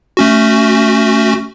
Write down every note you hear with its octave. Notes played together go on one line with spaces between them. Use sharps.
A3 C#4 F#4